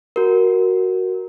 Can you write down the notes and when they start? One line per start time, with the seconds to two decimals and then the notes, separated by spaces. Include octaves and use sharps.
0.16 F#4 A#4